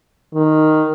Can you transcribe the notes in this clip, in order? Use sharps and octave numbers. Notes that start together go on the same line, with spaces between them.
D#3